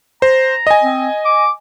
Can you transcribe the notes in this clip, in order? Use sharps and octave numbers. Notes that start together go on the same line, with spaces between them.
C5 A#5
D#5 G#5
C4
D6